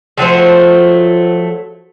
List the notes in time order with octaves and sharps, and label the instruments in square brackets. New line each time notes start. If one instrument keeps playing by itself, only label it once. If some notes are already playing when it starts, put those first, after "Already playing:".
[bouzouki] F3 F#3 A3 C5